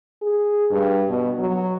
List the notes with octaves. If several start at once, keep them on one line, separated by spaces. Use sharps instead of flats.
G#4
G2
B2
F#3